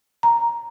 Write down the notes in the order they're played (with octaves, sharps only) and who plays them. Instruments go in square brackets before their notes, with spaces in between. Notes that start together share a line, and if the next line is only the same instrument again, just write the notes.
[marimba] A#5